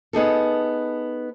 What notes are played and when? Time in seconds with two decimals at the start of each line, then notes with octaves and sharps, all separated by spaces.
0.13 B3 D#4 G#4 A4